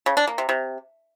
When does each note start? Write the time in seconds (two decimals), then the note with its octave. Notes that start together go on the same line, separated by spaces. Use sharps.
0.06 C#3
0.17 D4
0.27 A#3
0.38 C3
0.49 C3